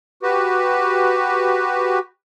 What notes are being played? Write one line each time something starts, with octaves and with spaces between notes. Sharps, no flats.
F#4 G4 B4